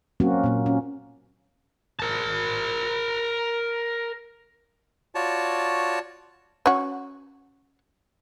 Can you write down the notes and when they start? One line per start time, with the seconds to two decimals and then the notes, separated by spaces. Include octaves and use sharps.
0.20 F#3 A#3 C4 C#4 F#4
0.44 A#2 A#3
0.66 C#4
2.00 A#4 A5
5.15 F4 F#4 C#5 D5 A5
6.66 C#4 F#4